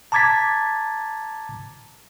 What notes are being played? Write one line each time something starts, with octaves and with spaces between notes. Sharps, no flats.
A5 A#5 D6 G#6 A6 B6